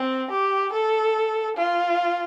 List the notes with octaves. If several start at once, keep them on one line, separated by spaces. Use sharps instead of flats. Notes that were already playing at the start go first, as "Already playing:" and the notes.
Already playing: C4
G4
A4
F4